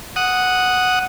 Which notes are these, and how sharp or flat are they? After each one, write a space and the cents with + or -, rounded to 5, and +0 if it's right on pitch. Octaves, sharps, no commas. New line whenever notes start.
F#5 +0 D#6 +0